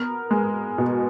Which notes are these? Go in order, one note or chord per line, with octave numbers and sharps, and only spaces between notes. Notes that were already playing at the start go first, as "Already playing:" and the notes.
Already playing: B3 A#4
G#3
B2